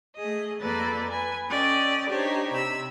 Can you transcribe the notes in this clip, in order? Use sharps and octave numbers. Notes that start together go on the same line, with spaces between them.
A3 G#4 D#5
F2 A#3 A4 B4 D5 A6
B4 G#5
C#4 A4 D5 D#5 G5
D4 D#4 G4 C5 C#5
C3 B5 E6